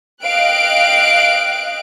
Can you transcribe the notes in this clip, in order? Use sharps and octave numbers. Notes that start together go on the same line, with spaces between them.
D#5 F5 G5 F#6 D7